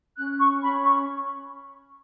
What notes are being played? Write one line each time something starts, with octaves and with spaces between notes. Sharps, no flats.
C#4 F#6
C#6
C#4 B5
C#6